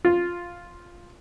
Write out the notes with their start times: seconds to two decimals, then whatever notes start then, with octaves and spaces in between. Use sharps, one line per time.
0.05 F4